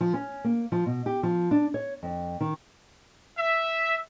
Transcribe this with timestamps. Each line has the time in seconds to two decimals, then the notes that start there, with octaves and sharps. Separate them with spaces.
0.01 F3
0.14 C#4
0.44 A#3
0.72 F3
0.86 B2
1.06 G4
1.23 F3
1.51 D4
1.74 C#5
2.03 F2
2.41 D#3
3.37 E5